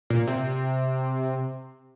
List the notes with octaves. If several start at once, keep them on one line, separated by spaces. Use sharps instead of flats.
A#2
C3